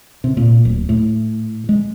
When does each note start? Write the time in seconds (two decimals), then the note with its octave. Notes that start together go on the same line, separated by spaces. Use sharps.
0.24 C3
0.37 A#2
0.65 D1
0.89 A2
1.69 G#3